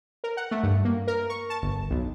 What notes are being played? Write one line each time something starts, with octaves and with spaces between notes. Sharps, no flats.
A#4
F#5
A3
G2
A#3
A#4
C#6
A5
G1
B1